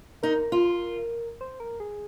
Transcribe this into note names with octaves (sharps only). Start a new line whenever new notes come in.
D#4 A#4
F4
C5
A#4
G#4